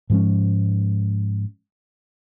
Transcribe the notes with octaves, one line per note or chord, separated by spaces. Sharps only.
G#2 F3 G#3 C#4